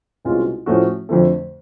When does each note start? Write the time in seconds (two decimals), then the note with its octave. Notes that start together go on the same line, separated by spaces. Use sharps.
0.25 C2 B2 G#3 C#4 F4
0.66 A2 F3 A3 C#4 F#4
1.09 F2 D3 F3 A3